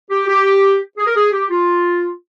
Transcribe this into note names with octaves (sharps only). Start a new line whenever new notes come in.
G4
G4
G#4
A#4
G#4
G4
F4